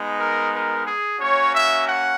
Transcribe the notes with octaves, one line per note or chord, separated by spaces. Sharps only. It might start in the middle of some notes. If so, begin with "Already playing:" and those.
Already playing: G#3 B3 D#4
A#4
A#4
G#4
A#3 C#4 F#4 C#5
E5
F#5